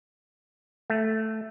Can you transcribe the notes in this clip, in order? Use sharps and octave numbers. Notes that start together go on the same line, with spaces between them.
A3